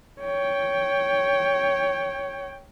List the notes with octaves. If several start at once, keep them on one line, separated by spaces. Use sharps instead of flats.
C#5 G5